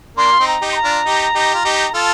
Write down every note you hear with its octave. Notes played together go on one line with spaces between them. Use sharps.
A#3 D4 C6
F4
C4 D#4
A#5
D#4 G4
C6
A#5
D4 F4
D#4 G4
D#4 G4
F4
D#4 G4
F4 A4 A5